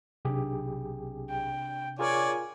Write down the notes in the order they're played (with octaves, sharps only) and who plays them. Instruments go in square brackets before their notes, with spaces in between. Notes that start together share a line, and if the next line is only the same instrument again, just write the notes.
[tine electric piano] B1 G4 G#4 [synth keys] C3 D4
[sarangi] G5
[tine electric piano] F4 G#4 A#4 [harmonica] C#5 D5 [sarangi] G#5